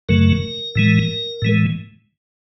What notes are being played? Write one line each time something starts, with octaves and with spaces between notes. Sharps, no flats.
F#2 C#3 F#3 A3 A#4
A2 E3 G#3
A2 E3 G#3